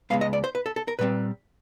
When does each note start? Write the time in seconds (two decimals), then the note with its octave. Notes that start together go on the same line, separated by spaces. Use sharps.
0.10 C#2 B2 G#3 B3 F5
0.21 D#5
0.33 D5
0.44 C5
0.55 B4
0.66 A4
0.76 A4
0.88 A#4
0.99 A#2 G3 C4 B4